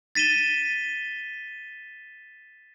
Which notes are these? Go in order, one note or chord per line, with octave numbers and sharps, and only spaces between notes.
A6 B6 D#7 E7 G7